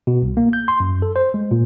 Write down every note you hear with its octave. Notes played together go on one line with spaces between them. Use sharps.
B2
C2
A#3
G6
C6
F#2
A4
C5
G#3
A#2